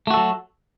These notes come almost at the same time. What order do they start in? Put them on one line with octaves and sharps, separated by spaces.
A3 F#4 A4 F#3